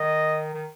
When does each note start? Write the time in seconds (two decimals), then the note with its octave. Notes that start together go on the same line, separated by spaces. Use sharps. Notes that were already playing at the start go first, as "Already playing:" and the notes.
Already playing: D#3 D#5
0.54 D#3